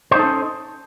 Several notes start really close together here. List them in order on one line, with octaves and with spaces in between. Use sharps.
C5 D#4 A4 C#4